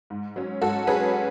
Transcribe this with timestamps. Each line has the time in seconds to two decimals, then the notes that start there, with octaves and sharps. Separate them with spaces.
0.10 G#2
0.36 F#3 C#4
0.61 G#2 F#4 A4
0.87 F#3 C#4 G#4 B4